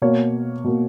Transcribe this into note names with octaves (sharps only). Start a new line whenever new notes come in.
B2 A#3 C#5
B2 A#3